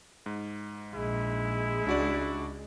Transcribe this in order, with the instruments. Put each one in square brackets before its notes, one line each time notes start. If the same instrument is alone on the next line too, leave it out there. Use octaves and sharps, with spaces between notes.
[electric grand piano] G#2
[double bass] A#1 [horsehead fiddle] G#3 [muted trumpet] E4
[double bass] C#2 [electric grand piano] D4 F#4 D5